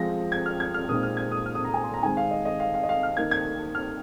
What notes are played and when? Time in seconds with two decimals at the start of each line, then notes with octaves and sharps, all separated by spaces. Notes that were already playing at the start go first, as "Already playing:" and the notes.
Already playing: F3 G#3 C4 A#6
0.32 G#6
0.46 F6
0.60 G#6
0.74 F6
0.89 A#2 G#3 C4 D#4 D#6
1.03 F6
1.17 G#6
1.31 D#6
1.46 F6
1.55 D#6
1.65 A#5
1.74 G#5
1.84 C6
1.94 A#5
2.02 D#3 G#3 C4 G#5
2.17 F5
2.31 D#5
2.45 D#5
2.60 F5
2.74 F5
2.83 D#5
2.89 F5
3.03 F6
3.17 D#3 A#3 D#4 G#6
3.31 G#6
3.75 F6